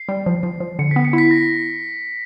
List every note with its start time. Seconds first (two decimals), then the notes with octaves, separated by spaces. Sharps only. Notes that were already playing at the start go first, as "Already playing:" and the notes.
Already playing: C7
0.09 G3
0.26 F3
0.43 F3
0.60 F3
0.79 D3 C#7
0.91 B3 B6
1.05 C#7
1.13 E4
1.18 B6
1.31 A#6